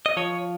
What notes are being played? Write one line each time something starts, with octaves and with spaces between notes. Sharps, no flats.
D#5
F3 C#5